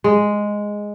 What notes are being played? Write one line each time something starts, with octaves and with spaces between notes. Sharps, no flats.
G#3